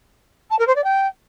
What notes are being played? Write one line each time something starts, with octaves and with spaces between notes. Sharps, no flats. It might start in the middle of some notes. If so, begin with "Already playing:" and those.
A5
A#4
C5
D5
G5